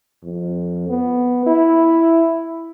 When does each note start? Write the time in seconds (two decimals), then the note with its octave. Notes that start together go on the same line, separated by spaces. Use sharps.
0.23 F2
0.89 B3
1.46 E4